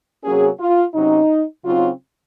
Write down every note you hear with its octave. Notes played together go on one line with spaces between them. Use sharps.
C3 F#3 A#3 C#4 G#4
F4
C3 F#3 C#4 D#4
C#3 F#3 C4 D#4 F4